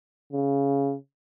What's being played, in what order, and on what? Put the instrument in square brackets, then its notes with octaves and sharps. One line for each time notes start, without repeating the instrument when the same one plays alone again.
[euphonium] C#3